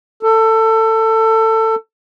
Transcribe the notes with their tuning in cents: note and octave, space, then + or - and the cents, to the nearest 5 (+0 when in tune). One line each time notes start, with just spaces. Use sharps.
A4 +20